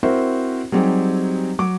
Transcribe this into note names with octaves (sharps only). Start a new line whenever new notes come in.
C4 E4 F#4 A#4 C5
F#3 G3 C4 D#4 G4 G#4
F#3 D6